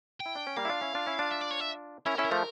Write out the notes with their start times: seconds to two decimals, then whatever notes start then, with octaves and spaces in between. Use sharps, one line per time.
0.20 G5
0.26 E4
0.35 D4
0.47 C#4
0.57 G3 A#3 F5
0.65 E4
0.69 D4 F4
0.81 C#4 E4
0.95 D4 F4
1.06 C#4 E4
1.19 D4 F4
1.31 E5
1.41 D5
1.51 C#5
1.60 E5
2.06 C#4 E4 A#4
2.17 C#4 E4 A4
2.25 A#4
2.31 F3 A3